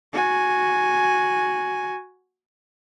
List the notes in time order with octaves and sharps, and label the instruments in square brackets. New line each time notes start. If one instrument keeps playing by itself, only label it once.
[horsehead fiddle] F#4 G#5